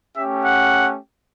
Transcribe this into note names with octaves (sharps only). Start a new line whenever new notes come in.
A3 C#4 G4 E5
F#5